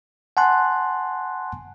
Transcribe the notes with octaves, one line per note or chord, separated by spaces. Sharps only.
F#5 G#5 A5 C6 F#6